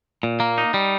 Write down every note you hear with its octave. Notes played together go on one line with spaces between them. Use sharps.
A#2
A#3
D#4
G3